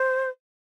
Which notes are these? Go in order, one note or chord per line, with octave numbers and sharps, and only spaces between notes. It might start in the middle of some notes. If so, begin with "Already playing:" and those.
Already playing: C5